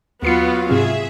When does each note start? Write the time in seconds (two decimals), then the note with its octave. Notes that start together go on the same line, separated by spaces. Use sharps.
0.22 D#2 F#3 B3 F4 C7 C#7
0.70 G#2 C3 C4 G#4 E5